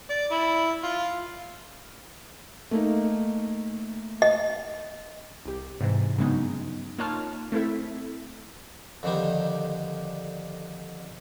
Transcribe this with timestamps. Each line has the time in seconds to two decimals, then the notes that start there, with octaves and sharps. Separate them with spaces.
0.10 D5
0.32 E4
0.84 F4
2.71 A3 A#3 D#4
4.22 D#5
5.45 C2 G4
5.81 G#2 C3 E3
6.18 G2 C#3 F#3 G#3 B3 D#4
6.98 A#3 D#4 F4 C#5 A5 F6
7.52 A3 C4 E4 A4 E5
9.03 F2 D3 D#3 G3